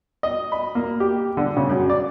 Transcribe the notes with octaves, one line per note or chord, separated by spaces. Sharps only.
D#5
B5
A#3
G4
D3
C#3
F#2
D5